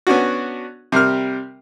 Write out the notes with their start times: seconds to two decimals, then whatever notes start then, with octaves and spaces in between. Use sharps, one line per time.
0.07 B3 C#4 D4 F#4
0.92 C3 G3 A#4 F6